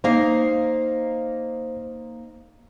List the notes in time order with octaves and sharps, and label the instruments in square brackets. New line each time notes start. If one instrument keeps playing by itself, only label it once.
[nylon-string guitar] A#3 D#4 F5 [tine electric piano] C5